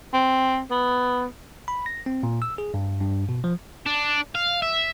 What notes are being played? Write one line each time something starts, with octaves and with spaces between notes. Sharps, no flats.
C4
B3
B5
A#6
C4
A#2
E6
G#4
G2
G2
B2
F3
D4
F5
E5